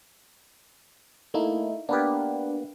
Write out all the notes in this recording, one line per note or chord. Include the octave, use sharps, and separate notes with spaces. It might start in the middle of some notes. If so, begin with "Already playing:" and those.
A3 A#3 D#4 E4
A#3 B3 D4 G4 B4